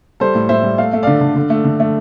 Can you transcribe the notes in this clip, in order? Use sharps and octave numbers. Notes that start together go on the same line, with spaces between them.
G3 A4 C5
A2
A2 C5 E5
G3
A3 F5
A3
D3 D5 F5
D3
D3
A3
D3
A3